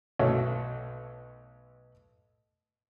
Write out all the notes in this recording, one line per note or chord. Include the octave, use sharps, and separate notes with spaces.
B1 A3 F#4 C#5 E5